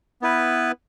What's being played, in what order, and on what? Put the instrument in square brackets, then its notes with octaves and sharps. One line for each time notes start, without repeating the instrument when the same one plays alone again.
[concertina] B3 E4 B4